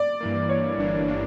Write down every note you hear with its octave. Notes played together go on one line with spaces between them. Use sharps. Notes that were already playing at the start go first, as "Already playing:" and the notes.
Already playing: D5
G2 E3 A#3
G2 E3 A#3 C#5
G1 G2 E3 A#3 D4
E3 A#3 D4